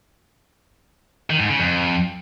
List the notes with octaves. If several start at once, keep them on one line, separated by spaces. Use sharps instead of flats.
D#3
G#2
C#3
F2